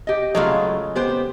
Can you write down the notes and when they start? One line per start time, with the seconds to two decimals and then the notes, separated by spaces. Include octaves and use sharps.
0.07 G4 D#5
0.35 C#3 F#3 G#3 A3 F4 D#5
0.95 B3 G4 C5